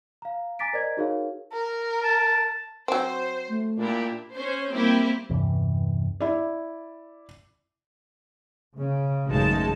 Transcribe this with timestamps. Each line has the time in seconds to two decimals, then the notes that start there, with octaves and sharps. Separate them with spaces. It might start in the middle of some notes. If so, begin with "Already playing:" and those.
0.22 F5 A#5
0.59 G#5 A#5 D6 A6 B6 D7
0.73 A#4 C5 D5 D#5 A#5 G#6
0.97 D#4 F#4 G#4 A#4 C#5 F5
1.53 A#4
2.04 A5
2.88 F#3 C4 C5
3.49 A3
3.78 A#2 D4 E4 G4
4.34 C#4 C5
4.73 G3 A#3 C4 E4 G4
5.30 E2 G2 C3 E3
6.20 E4 D5
8.77 C#3
9.28 A1 F#2 C#3 G#3 D#4 A5